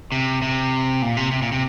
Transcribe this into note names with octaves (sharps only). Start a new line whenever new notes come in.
C3
C3
A#2
C3
C3
A#2
C3